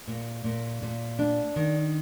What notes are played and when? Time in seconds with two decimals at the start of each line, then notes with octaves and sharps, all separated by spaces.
0.07 A#2
0.44 A#2
0.82 A#2
1.19 D4
1.56 D#3